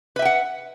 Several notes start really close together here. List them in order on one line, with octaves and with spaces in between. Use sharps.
B4 E5 G5 F#5